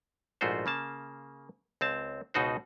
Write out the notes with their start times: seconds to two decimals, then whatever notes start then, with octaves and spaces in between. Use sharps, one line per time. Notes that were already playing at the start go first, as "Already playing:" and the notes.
0.41 A#1 G#2 A3 F4 F#4 C5
0.66 C#3 A#3 A5
1.81 C#2 C4 A5
2.34 C#2 B2 D#4 F#4 C5